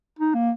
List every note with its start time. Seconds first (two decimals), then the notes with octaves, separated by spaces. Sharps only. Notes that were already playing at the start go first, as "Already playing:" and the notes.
0.19 D#4
0.35 A#3